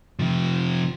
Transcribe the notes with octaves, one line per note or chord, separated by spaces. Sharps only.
C3 F3